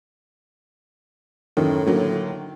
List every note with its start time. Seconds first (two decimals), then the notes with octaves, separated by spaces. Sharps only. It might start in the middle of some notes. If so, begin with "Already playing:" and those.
1.57 F#2 A2 D#3
1.86 D3 F#3 A#3